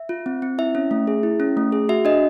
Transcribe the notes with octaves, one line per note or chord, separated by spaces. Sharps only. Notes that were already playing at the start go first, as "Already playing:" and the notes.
Already playing: E5
F4
C4
C4
E4 E5
C#4
A3
G#4
E4
C#4
A3
G#4
F#4 E5
D4 D#5